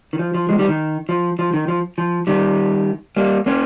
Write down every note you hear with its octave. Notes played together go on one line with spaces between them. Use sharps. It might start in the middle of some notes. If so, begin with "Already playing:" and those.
D#3
F3
F3
F3 G#3
D#3 G3
D#3
F3
F3
D#3
F3
F3
D#3 G3
G3 A#3
A#3 C#4